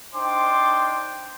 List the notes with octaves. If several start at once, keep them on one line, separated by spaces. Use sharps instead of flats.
D4 D#4 C5 G5 C6 D6